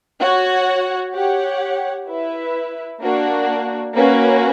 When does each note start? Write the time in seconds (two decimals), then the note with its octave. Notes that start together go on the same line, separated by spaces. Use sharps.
0.21 F#4 C#5 F#5
1.13 G4 C#5 F#5
2.08 E4 B4 E5
3.01 A#3 D4 F#4
3.95 A#3 C#4 F#4 B4